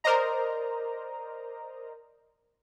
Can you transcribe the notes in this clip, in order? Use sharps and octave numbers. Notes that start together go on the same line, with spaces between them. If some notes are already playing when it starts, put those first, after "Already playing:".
A#4 C5 D5 D#5 A#5